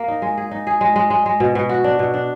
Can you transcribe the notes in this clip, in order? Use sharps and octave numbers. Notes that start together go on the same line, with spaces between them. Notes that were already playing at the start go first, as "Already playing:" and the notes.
Already playing: A#3
D#4
G#3
G#4
D#4
G#4
G#3
G#3
G#3
G#3
B2
B2
F#4
D4
B2
D4